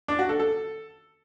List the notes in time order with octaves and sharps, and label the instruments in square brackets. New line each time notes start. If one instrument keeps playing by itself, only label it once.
[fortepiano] D4
F#4
A4
A4